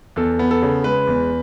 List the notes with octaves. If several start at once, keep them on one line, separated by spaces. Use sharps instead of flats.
E2 A4
B3
A4
C#3
G#3 B4
E2